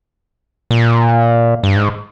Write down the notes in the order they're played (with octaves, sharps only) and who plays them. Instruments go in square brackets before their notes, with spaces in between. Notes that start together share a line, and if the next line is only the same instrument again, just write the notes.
[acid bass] A#2
G2
G#2